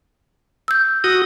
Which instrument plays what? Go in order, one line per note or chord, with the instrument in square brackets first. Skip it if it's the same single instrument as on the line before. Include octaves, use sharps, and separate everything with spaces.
[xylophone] E6 G6
[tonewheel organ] F#4 D#6